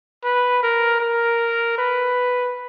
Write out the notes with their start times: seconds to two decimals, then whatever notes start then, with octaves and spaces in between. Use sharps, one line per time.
0.24 B4
0.63 A#4
1.00 A#4
1.78 B4